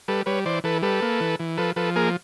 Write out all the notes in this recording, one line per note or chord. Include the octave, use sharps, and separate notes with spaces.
G3 A4 B4
G3 B4 C#5
E3 C5 D5
E3 A4 B4
G3 A4 B4
A#3
E3
E3
F3 A4 B4
F3 A4 B4
A#3 G#4 A#4